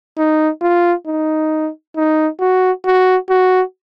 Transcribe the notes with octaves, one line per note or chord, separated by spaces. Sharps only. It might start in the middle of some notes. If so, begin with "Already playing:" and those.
D#4
F4
D#4
D#4
F#4
F#4
F#4